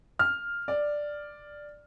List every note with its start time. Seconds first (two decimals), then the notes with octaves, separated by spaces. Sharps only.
0.19 F6
0.68 D5